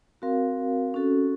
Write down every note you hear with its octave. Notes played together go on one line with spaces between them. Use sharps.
C4 F#4 A#4 F5
C#4 F#4 A4